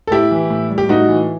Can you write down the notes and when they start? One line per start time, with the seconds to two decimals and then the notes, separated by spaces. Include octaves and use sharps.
0.07 A4
0.11 A2 E4 G4
0.31 E3
0.50 A2
0.70 G3
0.78 G4
0.89 A2 D#4 F#4
1.09 E3